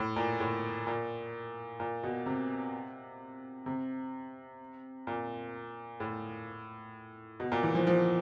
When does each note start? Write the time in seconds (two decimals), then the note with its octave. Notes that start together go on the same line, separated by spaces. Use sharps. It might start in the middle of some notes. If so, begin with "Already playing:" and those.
Already playing: A2
0.16 A#2
0.40 A2
0.87 A#2
1.80 A#2
2.03 B2
2.26 C3
3.66 C3
5.07 A#2
6.00 A2
7.40 B2
7.52 A#2
7.63 E3
7.75 F3
7.87 F3